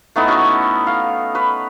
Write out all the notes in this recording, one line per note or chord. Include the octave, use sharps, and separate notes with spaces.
A3 B3 D#4 E4
C#4 F#4
F5
B4 C#5